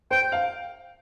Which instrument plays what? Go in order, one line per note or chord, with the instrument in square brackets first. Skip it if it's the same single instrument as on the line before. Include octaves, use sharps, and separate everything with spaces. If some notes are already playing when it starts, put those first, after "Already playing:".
[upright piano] C5 [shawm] G5
[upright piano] F5